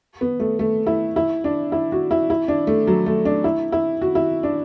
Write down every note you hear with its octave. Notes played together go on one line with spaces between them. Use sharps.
B3
A3
A3
E4
E4
D4
E4
F#4
E4
E4
D4
A3
F#3
A3
D4
E4
E4
F#4
E4
D4